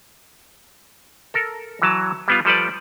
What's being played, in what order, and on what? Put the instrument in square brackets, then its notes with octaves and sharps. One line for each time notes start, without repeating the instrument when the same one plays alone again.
[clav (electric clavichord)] A4 A#4
E3 F#3 A5
G3 B3 F4
F3 G3 A4 B4 D5